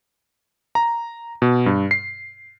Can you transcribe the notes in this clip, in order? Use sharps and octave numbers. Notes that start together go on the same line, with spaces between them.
A#5
B2
G2
C7